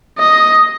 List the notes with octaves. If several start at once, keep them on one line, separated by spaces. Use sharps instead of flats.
D#5